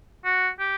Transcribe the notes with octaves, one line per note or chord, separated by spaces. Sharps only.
F#4
G4